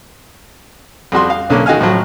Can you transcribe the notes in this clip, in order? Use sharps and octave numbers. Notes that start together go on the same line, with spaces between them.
F2 G3 F#4 C6
F5
B1 D3 A#3 C#4
D#3 F#4 D#5 F5 G#5 F6
A2 F3 F#3